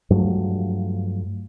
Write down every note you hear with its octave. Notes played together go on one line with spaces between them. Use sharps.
G2 F3 F#3 A3